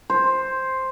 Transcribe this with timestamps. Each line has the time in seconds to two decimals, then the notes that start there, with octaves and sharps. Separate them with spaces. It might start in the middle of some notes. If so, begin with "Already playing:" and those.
0.10 C5